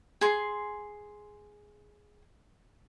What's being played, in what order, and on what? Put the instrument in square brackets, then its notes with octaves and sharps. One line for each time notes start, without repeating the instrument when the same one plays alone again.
[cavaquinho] G#4 C6